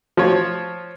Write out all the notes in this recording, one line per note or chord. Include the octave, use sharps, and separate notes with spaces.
F3 C#5